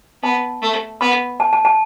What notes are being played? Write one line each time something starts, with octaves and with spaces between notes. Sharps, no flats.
B3 A5
A3
B3 B5
A5
A5
A5